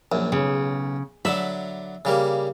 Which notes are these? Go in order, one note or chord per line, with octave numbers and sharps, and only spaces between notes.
A#1 F#2
B1 C#3
D3 F#3 E5 B5
C#3 G3 A#3